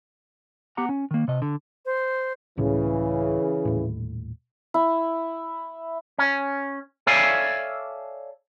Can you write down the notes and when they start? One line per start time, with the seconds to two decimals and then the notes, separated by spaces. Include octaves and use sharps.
0.77 B3 G4 F#5 A#5
0.89 C#4
1.11 D#3 A#3
1.28 C3 D#5
1.42 D3
1.85 C5
2.58 C#2 A2 C#3 E3
3.65 D#1 A2
4.74 E4
6.18 C#4
7.07 A4 C#5 D5 E5 F5 G#5